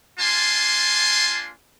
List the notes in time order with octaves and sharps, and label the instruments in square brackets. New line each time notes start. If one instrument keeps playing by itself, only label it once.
[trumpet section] A#3 D4 F4 G#5 A5 C6